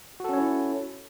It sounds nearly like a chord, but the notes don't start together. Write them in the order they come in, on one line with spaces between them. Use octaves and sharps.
F#4 A4 C#4 C#5 E4